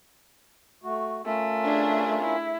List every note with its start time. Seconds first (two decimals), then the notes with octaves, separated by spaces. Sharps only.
0.84 A3 F#4
1.25 A3 C#4 F4 A#4
1.66 D4 G#4
2.23 E4